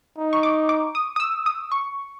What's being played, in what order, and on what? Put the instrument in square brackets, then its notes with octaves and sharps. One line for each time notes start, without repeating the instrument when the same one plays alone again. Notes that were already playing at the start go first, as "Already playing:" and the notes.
[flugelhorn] D#4
[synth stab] C#6
D6
D6
D#6
D#6
E6
D#6
C#6